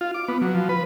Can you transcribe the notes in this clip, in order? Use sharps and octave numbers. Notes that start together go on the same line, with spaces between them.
F4
D6
B3
F#3
F3
B4